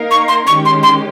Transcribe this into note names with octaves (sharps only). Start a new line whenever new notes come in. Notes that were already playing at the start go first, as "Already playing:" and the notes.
Already playing: A#3 D#4 A#4 F5
C#6
C6
D#3 G#3 C#4 G4 C#6
C6
C6